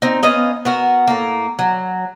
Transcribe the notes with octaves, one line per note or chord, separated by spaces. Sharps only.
C4 D#4
B3 C#4 D#5 F5
B3 F#4 A#4
A2 A#3
F#3